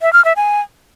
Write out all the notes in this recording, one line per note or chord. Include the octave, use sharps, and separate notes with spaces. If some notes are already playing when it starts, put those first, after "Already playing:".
E5
F6
E5
G#5